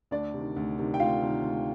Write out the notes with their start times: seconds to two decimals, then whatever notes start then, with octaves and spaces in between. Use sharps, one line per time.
0.11 D2 D4 D5
0.34 C3 D#3
0.56 D2
0.78 C3 D#3
0.94 G5
1.00 D2 F4 F5
1.22 C3 D#3
1.43 D2